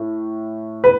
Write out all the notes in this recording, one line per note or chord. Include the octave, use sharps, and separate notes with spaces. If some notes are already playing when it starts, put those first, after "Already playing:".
Already playing: A2
B4